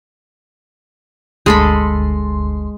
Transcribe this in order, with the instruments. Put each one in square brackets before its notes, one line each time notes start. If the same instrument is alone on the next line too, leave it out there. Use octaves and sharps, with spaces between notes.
[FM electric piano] G1 D2 C6 [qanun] G#3 A4 B5